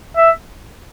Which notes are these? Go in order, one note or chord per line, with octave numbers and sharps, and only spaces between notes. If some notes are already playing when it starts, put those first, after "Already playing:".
E5